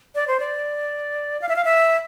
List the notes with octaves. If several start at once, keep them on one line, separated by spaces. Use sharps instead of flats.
D5
C5
D5
F5
E5
F5
E5